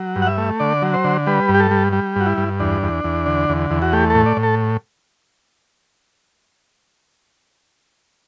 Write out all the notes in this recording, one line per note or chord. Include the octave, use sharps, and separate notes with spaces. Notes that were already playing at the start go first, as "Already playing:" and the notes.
Already playing: F#3
G2
F#5
E5
A3
D3 D5
F#3
C5
D3
G3 B4
G2
G4
A4
G3
G3
G2 F#4
E4
G2
E2 D4
E2
E2
D3
E2
E2
F#4
A3 G4
A2 A4
D5
A2
A4